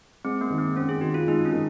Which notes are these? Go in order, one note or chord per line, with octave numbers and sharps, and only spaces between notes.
G#3 C4
A#3
D#3
C4
C4 C#4
G#4
D#3 F#4
F4
G#3 D#4
C#4
D#3